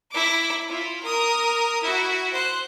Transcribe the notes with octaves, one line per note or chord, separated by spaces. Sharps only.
E4 D6
E4 F4
A#4 D#6
E4 F#4
C5 F#6